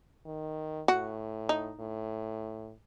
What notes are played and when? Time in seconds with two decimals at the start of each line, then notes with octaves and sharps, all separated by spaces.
0.26 D#3
0.88 A2 F#4
1.49 D#4
1.80 A2